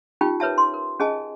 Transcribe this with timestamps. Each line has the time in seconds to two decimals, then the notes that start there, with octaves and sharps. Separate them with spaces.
0.21 C#4 D#4 F4 G4 G5
0.40 A#4 B4 C#5 E5 A5
0.58 C6
0.74 A#4
1.00 C#4 G#4 D#5 G#5 A5